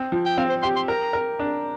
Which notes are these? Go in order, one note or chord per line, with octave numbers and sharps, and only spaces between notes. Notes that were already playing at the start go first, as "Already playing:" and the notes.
Already playing: C4
F3
G5
C4 F5
C5
G4 C6
C6
A#4 A#5
A#4
D4